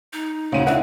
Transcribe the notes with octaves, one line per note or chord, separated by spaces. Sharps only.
D#4
D2 C#3 C4 F#4 D#7 E7
C4 D4 E4 B4 F5 F#5